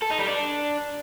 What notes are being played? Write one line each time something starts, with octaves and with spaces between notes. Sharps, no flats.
A4
D#4
G3
D4